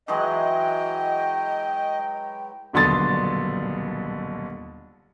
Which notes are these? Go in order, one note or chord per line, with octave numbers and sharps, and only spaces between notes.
E3 F#3 G#3 D#5 G5
D#1 B1 D3 C6 D#6 A6